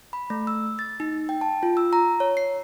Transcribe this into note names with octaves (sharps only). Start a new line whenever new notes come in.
B5
A3
E6
A6
D#4
G5
A5
F4
E6
A#5
C#5
C7